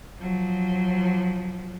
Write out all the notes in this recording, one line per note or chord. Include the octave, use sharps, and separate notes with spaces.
F3 F#3